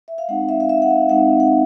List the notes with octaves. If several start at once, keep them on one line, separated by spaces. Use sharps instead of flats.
E5
F5
G#3 C4 D#4 F#5
E5
F5
E5
F#5
F5
G#3 C4 D#4 F#5
F#5